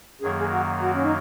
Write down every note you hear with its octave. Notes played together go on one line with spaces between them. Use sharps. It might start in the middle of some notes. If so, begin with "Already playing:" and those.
F#2 D#3 F#3 A#3 G#4
G#4
F#4
F#4
C#4
D#4